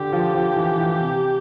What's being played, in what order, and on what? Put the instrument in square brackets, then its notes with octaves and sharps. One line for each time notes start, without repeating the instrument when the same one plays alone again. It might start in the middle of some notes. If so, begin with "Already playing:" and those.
Already playing: [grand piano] D3 [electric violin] G4
[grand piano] F3
F3
E3
E3
C3